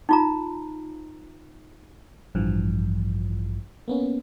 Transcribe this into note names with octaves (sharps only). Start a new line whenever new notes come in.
D#4 F4 A#5
A1 G2 E3 F3
A#3 B3 C#4